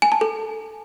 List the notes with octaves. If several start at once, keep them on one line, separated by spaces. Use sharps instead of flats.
G#5
A5
A4